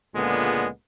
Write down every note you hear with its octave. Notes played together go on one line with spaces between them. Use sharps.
C#2 A#2 D3 G#3 B3